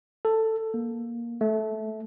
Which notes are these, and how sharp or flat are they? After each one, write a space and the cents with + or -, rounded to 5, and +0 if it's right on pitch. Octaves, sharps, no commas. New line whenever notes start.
A4 +10
A#3 +10
A3 -15